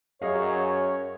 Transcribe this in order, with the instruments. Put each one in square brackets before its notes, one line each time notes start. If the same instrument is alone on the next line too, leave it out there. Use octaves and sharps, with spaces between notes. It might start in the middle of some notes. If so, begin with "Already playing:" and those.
[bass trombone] F#2 [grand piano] G#4 D#5 F5 [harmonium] C#5